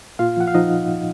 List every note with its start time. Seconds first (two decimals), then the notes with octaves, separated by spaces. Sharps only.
0.19 A#2 F4 F5
0.37 F3 F#5
0.47 F5
0.54 F3 D#4 D#5